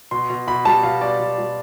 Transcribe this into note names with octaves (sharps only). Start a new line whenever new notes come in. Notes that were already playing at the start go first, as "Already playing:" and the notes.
B2 C6
B2
B2 B5
G3 A5
B2 F5
B2 D5
B2
G3